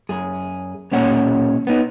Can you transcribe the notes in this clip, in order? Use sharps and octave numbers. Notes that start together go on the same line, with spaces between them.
F#2 G#4
B1 A#2 A#3 C#4 C#5 F#5
B3 D#4